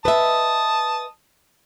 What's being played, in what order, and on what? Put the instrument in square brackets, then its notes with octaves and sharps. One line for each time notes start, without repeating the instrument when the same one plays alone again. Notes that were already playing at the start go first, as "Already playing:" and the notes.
[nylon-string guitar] B4 D#5 E5 [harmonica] A5 D#6